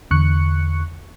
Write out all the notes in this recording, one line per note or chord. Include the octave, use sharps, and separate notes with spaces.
E2 D3 C#6 F#6 C#7